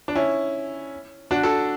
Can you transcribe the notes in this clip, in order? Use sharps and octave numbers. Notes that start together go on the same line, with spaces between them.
D4
C#4 E4
D4 F#4
F#4 A4